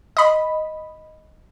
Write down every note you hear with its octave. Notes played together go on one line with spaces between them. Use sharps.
D#5 B5